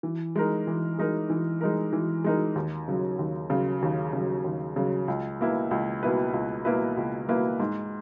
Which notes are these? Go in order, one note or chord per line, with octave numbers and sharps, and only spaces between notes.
E3
G#3 D#4 A#4
E3
G#3 D#4 A#4
E3
G#3 D#4 A#4
E3
G#3 D#4 A#4
D#2
C#3 F#3
D#2
C#3 F#3
D#2
C#3 F#3
D#2
C#3 F#3
C#2
B2 A#3 E4 B4
C#2
B2 A#3 E4 B4
C#2
B2 A#3 E4 B4
C#2
B2 A#3 E4 B4
G#2